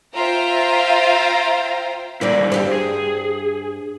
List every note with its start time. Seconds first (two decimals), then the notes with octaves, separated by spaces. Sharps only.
0.15 F4 C5 E5 F5 G5 A#5
2.21 D3 G3 A#3 C4 E4 D5
2.52 G2 G4 C5
2.72 G#4